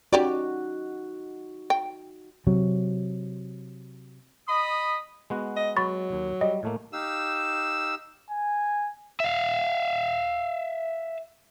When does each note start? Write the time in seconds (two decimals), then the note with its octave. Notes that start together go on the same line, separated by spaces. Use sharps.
0.13 C#4 D#4 F#4 G4 D5
1.70 G5
2.47 C3 F#3
4.48 D#5 B5 D#6
5.30 G#3 B3 F#4
5.57 D#5
5.77 F#3 B5 C#6 A6
6.12 D#2
6.41 G3 D#5
6.63 A2 A3 A#3
6.93 D#4 G4 F5 E6
8.30 G#5
9.20 E5 F5